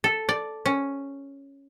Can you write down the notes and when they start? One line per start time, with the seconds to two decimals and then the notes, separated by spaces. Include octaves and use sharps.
0.04 A4
0.29 D5
0.66 C#4